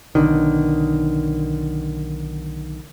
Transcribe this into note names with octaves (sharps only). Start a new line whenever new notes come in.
B1 D3 D#3